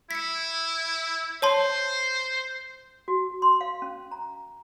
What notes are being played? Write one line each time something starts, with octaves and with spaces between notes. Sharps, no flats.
E4 B6 C#7
C5 C#5 A5 C6
F#4
C6
F5
C#4
A#5